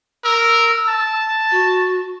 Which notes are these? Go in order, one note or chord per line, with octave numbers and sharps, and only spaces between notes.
A#4 E6
A5
F#4